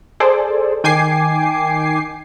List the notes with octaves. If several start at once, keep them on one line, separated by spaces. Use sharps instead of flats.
G#4 A4 C5 D5
D#3 G5 G#5 D6 C7